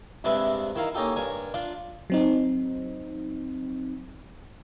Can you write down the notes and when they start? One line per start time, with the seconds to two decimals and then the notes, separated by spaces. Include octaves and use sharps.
0.24 G2 C3 G3 G#3 B4 E5
0.75 D#3 E4 F5 A#5
0.94 A#3 C#4 D#4 G4 A4
1.16 G2 A#4 G#5
1.54 D4 F4 D5
2.10 F#3 C4 D#4